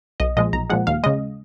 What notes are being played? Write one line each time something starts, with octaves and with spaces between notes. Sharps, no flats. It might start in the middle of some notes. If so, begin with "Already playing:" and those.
B1 D#5
A#2 F3 G#3 D#5
B1 A#5
A#2 F3 G#3 F#5
D#2 F5
C#3 G#3 D#5